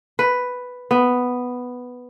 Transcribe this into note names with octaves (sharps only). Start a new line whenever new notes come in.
B4
B3